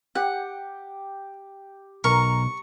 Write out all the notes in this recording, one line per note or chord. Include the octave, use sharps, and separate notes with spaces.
G4 F#5
B1 A#4 A#5 C#6